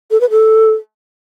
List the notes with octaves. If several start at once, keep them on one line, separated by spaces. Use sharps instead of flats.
A4
B4
A4